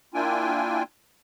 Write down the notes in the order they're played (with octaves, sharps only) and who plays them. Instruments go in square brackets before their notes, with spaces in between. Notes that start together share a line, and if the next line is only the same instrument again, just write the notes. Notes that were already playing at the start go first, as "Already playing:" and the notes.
[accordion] A#3 D4 E4 F4 G5 G#5